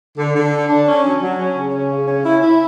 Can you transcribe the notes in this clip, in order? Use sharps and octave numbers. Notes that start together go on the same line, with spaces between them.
D3
D3
D4
D4
C#4
F#3
F#3
C#4
C#3
C#4
C#3
C#4
E4
E4